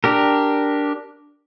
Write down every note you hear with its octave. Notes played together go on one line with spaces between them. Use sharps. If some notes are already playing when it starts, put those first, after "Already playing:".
D4 G4 A#4